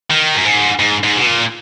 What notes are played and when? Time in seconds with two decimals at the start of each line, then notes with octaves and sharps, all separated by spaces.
0.11 D#3
0.35 F#2
0.45 G#2
0.79 G#2
1.03 G#2
1.17 B2
1.26 A#2